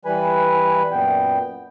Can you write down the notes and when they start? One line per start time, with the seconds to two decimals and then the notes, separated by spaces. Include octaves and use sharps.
0.05 E3 G3 B4 G#5 B5
0.91 F#2 A#2 B3 G5